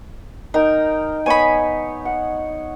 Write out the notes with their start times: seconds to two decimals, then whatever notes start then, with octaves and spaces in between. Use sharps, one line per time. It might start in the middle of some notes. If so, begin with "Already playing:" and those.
0.54 D#4 A#4 G5
1.26 B3 C#5 D#5 G#5 B5
2.05 F#5